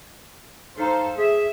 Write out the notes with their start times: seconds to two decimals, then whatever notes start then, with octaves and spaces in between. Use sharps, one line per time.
0.78 D#4 A4 C5 F5
1.17 G#4 E5